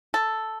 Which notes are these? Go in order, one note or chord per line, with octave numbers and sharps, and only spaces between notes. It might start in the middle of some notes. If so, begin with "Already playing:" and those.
A4